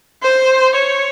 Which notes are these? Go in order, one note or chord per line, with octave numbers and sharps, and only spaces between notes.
C5
C#5